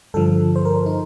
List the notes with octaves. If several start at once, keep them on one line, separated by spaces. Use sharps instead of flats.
G2 D3 F3 A4
C5
A#4
C5
D#4